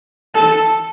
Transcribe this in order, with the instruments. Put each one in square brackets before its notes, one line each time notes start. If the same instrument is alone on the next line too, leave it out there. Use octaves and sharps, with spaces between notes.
[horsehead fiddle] A4